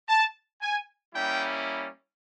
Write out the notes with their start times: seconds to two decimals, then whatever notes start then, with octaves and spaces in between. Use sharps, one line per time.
0.09 A5
0.62 G#5
1.14 G3 A#3 C#4 E4 G5